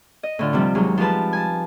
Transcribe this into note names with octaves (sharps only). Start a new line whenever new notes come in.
D#5
A2 D3 F4
C3 F3 G3 C4
D#2 F#3 G#3 D#4
F3 G#3 G4 B4 A5
G#5 A5